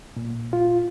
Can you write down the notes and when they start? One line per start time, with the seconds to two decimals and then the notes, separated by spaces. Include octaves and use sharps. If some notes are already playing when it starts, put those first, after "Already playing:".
0.17 A#2
0.53 F4